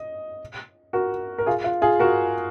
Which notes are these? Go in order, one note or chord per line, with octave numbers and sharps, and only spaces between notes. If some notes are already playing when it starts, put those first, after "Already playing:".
Already playing: D#5
F#4 A#4
A#4
F4 G#4
F4
F4 G#4
F#4 A#4